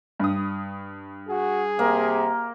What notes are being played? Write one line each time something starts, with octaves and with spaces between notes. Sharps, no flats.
G2 D#6
F#4 G#4
C3 A#3